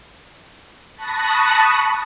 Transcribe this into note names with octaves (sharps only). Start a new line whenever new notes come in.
A5 B5 C#6 D#6 F#6 A#6